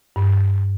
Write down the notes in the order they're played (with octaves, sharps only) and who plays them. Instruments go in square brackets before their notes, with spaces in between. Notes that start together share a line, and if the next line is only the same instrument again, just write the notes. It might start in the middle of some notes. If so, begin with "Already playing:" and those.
[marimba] G2